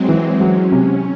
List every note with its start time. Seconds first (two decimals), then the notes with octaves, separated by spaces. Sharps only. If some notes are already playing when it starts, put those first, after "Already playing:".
Already playing: F#3 G#3 C4
0.08 E3
0.40 F#3 C#4
0.72 C3